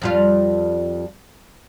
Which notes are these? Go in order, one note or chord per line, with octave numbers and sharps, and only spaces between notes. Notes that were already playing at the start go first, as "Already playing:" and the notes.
F2 G3 F4